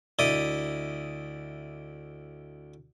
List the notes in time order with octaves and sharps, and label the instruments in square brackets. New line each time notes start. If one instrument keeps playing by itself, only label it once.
[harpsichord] D2 E4 D5 D#5 D#6